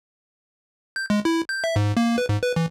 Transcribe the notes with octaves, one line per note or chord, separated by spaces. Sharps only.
G6
G#3
E4
G6
E5
G#2
A#3
B4
G#2
B4
E3